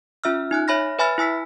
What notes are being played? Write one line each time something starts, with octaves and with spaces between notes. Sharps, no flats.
C#4 F4 E5 E6 F6
D#4 G#5 F#6
C#5 E5 B5 F6 A#6
B4 E5 G#5 B5 F6 A6
E4 G#5 E6 B6